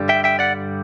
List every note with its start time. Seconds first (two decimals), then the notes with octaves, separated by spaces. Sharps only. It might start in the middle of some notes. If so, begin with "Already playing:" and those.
Already playing: G2 D3 G3
0.09 E5 G5
0.24 E5 G5
0.39 D5 F#5